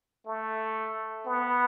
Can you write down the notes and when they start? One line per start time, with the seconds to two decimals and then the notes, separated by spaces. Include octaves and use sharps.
0.26 A3
1.26 B3